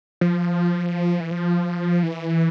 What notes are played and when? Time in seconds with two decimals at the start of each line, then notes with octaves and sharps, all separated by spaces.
0.21 F3
1.20 E3
1.31 F3
2.03 E3